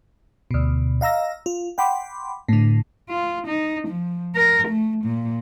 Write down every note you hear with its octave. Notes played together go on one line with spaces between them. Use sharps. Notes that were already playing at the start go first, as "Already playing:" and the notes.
D2 B2
D#5 F5 A#5 E6 A#6
F4
F#5 G5 B5 C6 D6
A2 D3
F4
D#4
F3
A#4
A3
A#2